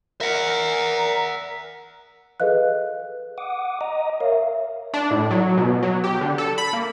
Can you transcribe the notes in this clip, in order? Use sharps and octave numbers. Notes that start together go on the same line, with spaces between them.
A#4 E5 F#5
G#4 A4 B4 D#5 F5 F#6
F#5 D6 D#6
D#5 A#5 D#6
A#4 C#5 E5 F5
D4
A2
F#3
B2
F#3
G4
D3
A4
B5
A#3